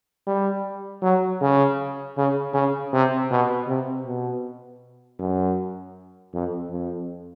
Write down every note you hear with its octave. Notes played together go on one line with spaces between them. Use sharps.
G3
F#3
C#3
C#3
C#3
C3
B2
C3
B2
F#2
F2
F2